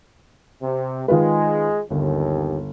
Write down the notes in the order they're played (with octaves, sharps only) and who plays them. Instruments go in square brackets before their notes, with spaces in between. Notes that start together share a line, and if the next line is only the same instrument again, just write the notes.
[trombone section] C3
[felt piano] D#3 F4 B4 [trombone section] G#3
[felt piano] G1 [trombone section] D#2